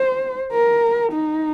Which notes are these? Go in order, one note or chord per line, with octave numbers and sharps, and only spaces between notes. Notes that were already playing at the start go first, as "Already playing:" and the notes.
Already playing: C5
A#4
D#4